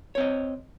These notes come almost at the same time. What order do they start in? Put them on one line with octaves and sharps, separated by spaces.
C#5 C4 D#5